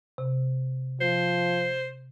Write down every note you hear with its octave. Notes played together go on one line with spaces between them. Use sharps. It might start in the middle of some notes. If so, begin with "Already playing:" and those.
C3
F3 C5